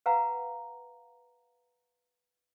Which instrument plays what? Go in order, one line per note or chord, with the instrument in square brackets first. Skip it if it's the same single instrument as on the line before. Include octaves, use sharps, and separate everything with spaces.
[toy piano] B4 F5 F#5 A#5